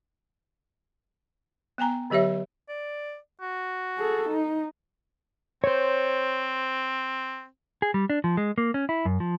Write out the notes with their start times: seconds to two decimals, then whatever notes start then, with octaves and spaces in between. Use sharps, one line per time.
1.78 B3 G5 G#5 A#5
2.10 D3 F#3 G4 C#5 E5
2.69 D5
3.41 F#4
3.97 G#4 A4
4.29 D#4
5.64 C4 C5 C#5
7.82 G#4
7.94 G3
8.10 D4
8.24 F3
8.37 G#3
8.58 A#3
8.74 C#4
8.89 E4
9.05 F#2
9.20 F3